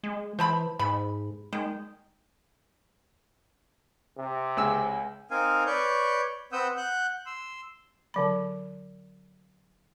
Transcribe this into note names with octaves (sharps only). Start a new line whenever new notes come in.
G#3
E3 C5 A5 B5
G#2 B5
D#3 G#3
C3
C#2 G#4 E6
C4 D#4 A#4 F5 G#5
B4 C#5 D5 C#6 G6
C4 B4 F#5 D#6 E6 G6
F#5 F#6 G6
C6 E6
D3 F#3 B5